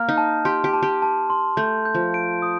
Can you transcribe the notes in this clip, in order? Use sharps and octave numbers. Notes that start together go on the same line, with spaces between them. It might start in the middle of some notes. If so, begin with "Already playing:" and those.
Already playing: A#3 F6
D#4
A5
G4 C6
G4
A5
G4
A5
C6
A3 G6
G6
F3
D7
D#6